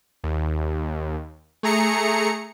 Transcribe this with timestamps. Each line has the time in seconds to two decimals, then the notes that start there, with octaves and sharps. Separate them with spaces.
0.24 D#2
1.63 A3 G#4 A#5 C#7